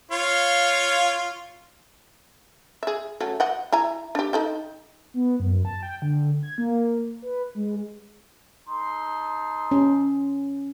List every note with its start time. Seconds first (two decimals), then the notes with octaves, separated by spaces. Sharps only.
0.12 F4 C#5 F5
2.83 G#4 E5
3.20 F#3 A3 C#4
3.40 D#5 F#5 G5
3.72 E4 G#5 A#5
4.15 D4 G4
4.33 D#4 A4 G5
5.14 B3
5.40 F#2
5.65 A5
5.83 G5
6.02 D3
6.43 G#6
6.58 A#3
7.22 B4
7.55 G#3
8.67 D#4 A4 C6
9.71 C#4